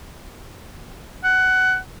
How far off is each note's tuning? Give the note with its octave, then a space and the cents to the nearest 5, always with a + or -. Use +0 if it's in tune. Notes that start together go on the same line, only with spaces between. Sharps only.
F#5 +15